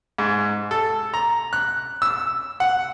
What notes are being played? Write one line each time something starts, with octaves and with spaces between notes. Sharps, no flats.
G#2
A4
A#5
F#6
E6
F#5